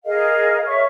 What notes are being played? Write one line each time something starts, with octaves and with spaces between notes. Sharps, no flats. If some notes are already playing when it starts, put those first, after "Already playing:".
G#4 A#4 D#5 F5
C#5 E5 C#6